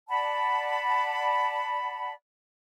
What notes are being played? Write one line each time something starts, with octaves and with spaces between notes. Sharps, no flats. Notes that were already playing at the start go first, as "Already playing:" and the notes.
D5 F#5 A5 B5